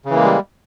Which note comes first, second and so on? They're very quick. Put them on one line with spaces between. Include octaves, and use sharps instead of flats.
C#3 E3 A#3 G#3 G3